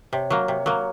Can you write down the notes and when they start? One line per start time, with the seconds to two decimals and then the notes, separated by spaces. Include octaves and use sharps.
0.13 C3 C#5
0.30 F#3 A#3
0.48 C3
0.66 F#3 A#3